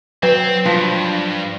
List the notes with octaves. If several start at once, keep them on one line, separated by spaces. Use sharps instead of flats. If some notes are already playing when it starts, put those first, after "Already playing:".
F#3 C4 B4
G2 F3